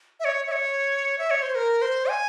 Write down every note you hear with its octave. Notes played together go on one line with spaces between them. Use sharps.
E5
C#5
E5
C#5
E5
C#5
C5
A#4
C5
G#5